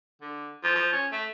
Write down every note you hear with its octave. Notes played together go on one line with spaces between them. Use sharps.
D3
F3
F3
C#4
A3